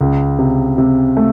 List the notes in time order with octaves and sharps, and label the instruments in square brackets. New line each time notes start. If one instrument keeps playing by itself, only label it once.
[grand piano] C#2
C3
C3
A3